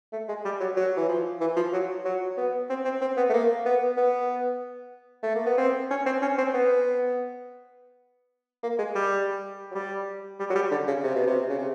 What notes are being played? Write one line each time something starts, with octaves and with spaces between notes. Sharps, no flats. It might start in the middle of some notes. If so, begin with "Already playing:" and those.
A3
G#3
G3
F#3
F#3
E3
F3
E3
F3
F#3
F#3
B3
C4
C4
C4
B3
A3
A#3
B3
B3
A3
A#3
B3
C4
C#4
C4
C#4
C4
B3
A#3
G#3
G3
F#3
G3
G3
F#3
G3
D3
C#3
C3
B2
C3
C#3
C3